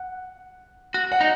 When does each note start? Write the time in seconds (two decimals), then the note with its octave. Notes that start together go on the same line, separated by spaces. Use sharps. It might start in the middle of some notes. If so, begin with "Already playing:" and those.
Already playing: F#5
0.94 F#4
1.12 F#5
1.21 D#4